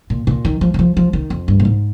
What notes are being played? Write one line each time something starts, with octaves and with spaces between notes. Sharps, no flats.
A#2
A#2
D#3
F3
D#3
F3
F3
D#3
F2
G2
A#2
G#2